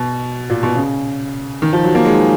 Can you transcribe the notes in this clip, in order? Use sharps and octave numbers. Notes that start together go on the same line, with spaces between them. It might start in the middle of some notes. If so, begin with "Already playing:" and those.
Already playing: B2
A#2
B2
C#3
D#3
F3
F#3
A#3
G#3